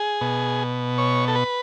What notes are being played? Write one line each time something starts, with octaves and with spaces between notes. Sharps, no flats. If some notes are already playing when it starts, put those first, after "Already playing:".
Already playing: G#4
B2
C#5
A4
B4